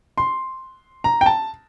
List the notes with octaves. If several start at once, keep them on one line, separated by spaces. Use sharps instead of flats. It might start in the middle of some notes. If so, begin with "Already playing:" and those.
C6
A#5
G5
A5